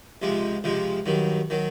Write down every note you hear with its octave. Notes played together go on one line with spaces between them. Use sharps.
C#2 C3 F3 G#3
C#2 C3 F3 G#3
G2 D#3 F#3
D#3 F#3